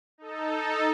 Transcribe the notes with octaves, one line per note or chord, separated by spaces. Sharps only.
D#4 A4